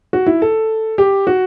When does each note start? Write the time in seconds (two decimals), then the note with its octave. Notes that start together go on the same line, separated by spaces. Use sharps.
0.13 F#4
0.26 E4
0.42 A4
0.98 G4
1.27 F#4